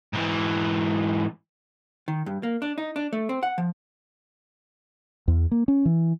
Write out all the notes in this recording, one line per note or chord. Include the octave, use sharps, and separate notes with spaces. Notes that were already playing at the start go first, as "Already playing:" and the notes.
G#2 E3
D#3
G2
A#3
D4
D#4
D4
A3
C4
F#5
F3
E2
A#3
C#4
E3